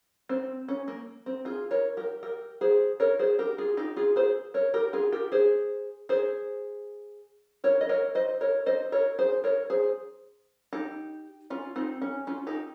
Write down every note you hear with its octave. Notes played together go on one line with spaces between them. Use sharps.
C4
C#4
A#3
C4
F4 G#4
A#4 C#5
G4 A#4
G4 A#4
G#4 C5
A#4 C#5
G#4 C5
G4 A#4
F4 G#4
D#4 G4
F4 G#4
G#4 C5
A#4 C#5
G4 A#4
F4 G#4
G4 A#4
G#4 C5
G#4 C5
A#4 C#5
D#5
A#4 C#5
C5 D#5
A#4 C#5
C5 D#5
A#4 C#5
G#4 C5
A#4 C#5
G#4 C5
D#4 G4
C#4 F4
C4 D#4
C#4
C#4 F4
D#4 G4